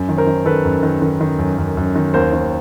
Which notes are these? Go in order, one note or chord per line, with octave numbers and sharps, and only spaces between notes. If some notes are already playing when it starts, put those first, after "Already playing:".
Already playing: F#2
D#3
A#4 C5
D#3
D#3 A4 B4
F#2
D#3
D#3
D#3
F#2
F#2
F#2
D#3
D#2 A#4 C5
D#3